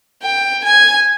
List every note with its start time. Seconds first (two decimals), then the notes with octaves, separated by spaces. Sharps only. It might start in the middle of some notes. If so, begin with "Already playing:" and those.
0.22 G5
0.64 G#5